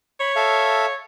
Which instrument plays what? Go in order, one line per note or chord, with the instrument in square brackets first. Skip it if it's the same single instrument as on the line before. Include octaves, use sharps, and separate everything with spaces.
[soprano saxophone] C#5 [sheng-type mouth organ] B5
[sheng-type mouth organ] A4 E5 F5